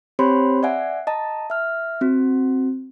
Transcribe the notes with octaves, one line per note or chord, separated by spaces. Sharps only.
C4 G4 C5 C#5 B5 C6
D5 E5 F#5 G#5
D#5 A5 A#5
E5 F6
C4 F#4